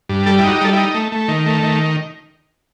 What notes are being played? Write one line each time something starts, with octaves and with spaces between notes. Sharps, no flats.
G2
G3 A4
E4
D#4 F#4
G4
G3 A4
E4
D#4
A3
A3
D#3
A3
D#3